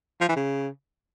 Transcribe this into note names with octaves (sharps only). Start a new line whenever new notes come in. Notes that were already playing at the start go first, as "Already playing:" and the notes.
F3
E3
C#3